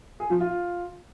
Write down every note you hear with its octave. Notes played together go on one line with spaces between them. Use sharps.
G#4
F3
F4